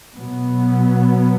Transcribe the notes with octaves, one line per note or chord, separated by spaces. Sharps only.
B2 F#3 B3